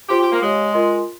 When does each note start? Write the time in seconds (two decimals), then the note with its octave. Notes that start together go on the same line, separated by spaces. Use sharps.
0.09 F4 G4 C5 G5 C6
0.20 G4
0.32 A#3
0.42 G#3 G4 C#5 F5
0.74 F4 A#4 D#5 G#5 C6